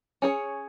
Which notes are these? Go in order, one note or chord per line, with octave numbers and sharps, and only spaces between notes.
C#4 G#4 C#5